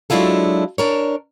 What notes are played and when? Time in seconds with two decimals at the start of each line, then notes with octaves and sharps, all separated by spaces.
0.10 F#3 G#3 D4 E4 F4 A4
0.78 D4 A#4 C#5